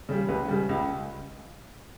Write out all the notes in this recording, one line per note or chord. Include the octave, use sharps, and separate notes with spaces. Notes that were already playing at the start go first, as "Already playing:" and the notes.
C#3 G3
C#2 B4
C#3 G3
C#2